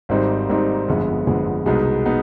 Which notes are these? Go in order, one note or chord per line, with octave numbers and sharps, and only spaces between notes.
G#1 G#2 G3 C4 D#4
G#1 G#2 G3 C4 D#4
G1 F2 D3 G#3 B3
G1 F2 D3 G#3 B3
C2 B2 G#3 B3 D#4
B3 D#4